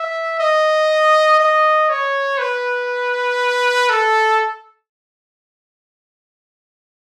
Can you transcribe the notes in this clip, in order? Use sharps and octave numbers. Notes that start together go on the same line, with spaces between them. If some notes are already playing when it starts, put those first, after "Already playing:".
Already playing: E5
D#5
D#5
C#5
B4
A4